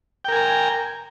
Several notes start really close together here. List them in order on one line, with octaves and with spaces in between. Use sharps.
G5 A#4 G#5 A#5